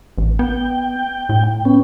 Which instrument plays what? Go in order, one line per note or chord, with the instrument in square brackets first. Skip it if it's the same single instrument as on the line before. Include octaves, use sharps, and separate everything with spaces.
[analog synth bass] A1
[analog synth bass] B3 [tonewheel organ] G5
[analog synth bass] A2
[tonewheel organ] B3 C#4